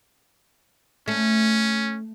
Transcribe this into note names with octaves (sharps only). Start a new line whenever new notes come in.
A3 C#4